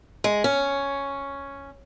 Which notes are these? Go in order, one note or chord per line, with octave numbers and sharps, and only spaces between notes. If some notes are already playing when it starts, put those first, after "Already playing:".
G#3
C#4